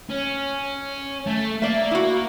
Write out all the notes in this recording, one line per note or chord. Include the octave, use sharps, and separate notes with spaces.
C#4
A3
A#3 D5 E5
E4 F#4